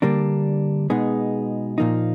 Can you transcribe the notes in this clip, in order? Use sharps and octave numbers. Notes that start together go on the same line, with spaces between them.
D3 G3 A#3 D4
B2 G#3 B3 D#4 G#4
A#2 F3 A#3 D#4